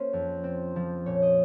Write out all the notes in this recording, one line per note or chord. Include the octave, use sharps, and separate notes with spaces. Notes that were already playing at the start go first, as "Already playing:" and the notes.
Already playing: A#3 C#4 A#4 C5
F2
C4
F3
A#2 C#5
D#5